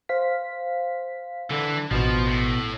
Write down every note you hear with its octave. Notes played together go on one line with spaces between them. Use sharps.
C5 F5 B6
D3 E3
A1 B2 F3
A2